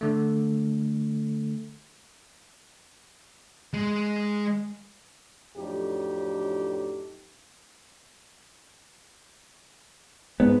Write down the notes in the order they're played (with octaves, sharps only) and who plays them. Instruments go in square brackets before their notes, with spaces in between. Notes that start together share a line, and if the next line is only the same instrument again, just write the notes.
[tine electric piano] D3 A3
[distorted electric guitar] G#3
[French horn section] F2 A2 F#3 D4 D#4 G4
[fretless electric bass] G#2 [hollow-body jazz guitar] B3